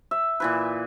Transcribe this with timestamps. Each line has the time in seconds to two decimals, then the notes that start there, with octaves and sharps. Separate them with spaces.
0.11 E5
0.40 A#2 E3 B4